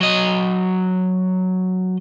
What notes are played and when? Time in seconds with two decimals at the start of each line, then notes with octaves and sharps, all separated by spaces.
0.01 F#3 D#5